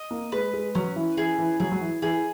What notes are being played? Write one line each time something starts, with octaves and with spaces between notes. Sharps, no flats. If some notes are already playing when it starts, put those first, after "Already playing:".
Already playing: D#5
A#3
G#3 B4
G#3
F#3 C#4
E3
E3 G#4
E3
F#3 G#4
F#3
E3
E3 G#4